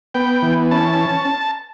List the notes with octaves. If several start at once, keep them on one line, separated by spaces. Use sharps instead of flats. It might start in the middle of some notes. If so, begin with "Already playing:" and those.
B3 G5
E3
C#4 A5